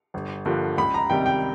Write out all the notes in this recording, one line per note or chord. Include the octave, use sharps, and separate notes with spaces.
G1
G2 D3 F3 A#3
C#2 B5
A#5
C3 D#3 G3 G5
G5